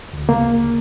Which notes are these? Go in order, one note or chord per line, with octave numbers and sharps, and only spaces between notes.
D2
C#3 A#3